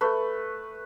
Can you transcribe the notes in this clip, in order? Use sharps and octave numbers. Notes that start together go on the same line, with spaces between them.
A3 B4